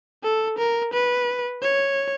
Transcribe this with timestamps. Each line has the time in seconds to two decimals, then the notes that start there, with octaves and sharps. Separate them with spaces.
0.24 A4
0.58 A#4
0.93 B4
1.62 C#5